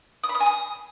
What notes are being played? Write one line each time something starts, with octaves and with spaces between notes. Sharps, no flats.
D#6
B5
D#6
G#5
D#6